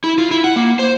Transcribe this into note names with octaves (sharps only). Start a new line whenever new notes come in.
E4
F4
E4
F#5
A#3
C5